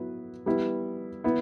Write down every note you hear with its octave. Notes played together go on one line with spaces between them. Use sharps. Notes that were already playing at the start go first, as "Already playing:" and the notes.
Already playing: F#3 B3 E4 B4
G3 B3 E4
B3 E4